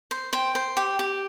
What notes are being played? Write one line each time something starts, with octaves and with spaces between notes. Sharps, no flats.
C5
C5 G5
C5
G4
G4